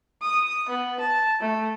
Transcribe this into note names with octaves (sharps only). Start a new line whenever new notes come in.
D#6
B3
A5
A3